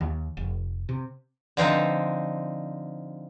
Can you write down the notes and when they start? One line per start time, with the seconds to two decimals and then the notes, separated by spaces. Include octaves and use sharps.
0.01 D#2
0.37 F1
0.89 C3
1.57 D3 F3 C4 D#4